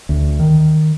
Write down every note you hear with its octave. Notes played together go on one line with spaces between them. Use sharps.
D2
D#3